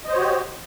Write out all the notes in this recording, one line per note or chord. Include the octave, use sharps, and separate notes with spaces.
F#4 G4 C5 C#5 D#5